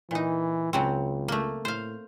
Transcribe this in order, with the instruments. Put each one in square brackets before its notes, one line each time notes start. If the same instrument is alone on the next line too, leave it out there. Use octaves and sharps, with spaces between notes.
[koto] A#2 D#4 [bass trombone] E3
[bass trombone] C#2 [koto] C#3 F#3 C4
[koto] A3 A#3
[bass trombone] A2 [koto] C5 F5